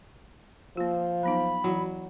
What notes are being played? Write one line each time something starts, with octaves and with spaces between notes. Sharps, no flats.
F3 A#3 F4
F#3 B3 D#4 B5
E3 F#3 E4